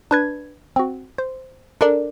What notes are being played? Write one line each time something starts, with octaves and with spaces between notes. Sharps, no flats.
D4 B4 G#6
C4 F#4
C5
D4 A4 A#4 D5